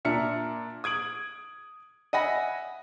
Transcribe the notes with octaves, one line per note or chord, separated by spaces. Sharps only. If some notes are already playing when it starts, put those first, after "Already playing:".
A#2 D4 E5 A#5 F6 C#7
D#6 G#6 D7 F#7
D#5 E5 F#5 G#5 B5 A#6